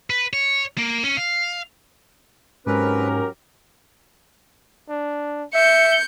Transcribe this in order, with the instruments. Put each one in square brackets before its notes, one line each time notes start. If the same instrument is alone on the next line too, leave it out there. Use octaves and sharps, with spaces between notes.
[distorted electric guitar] B4
C#5
A#3
C#4
F5
[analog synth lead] G#2 [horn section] F#3 G4 A#4 [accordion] C4 B4 [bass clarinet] C#4
[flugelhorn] D4
[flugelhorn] E5 [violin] G6 C#7